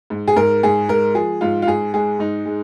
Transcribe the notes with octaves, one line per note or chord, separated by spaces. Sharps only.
G#2
G#4
G#2 A#4
G#2 G#4
G#3 A#4
F3 G#4
G#2 F4
F4
G#2 G#4
G#3 G#4
G#2 D#4
G#3